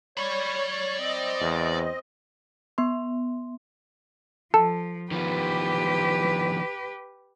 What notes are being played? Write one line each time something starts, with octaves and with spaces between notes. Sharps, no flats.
C#5 D5 B5
C4 D#5
E2
B3 C6
F3 A4
D#3 F3 B3 G4 B4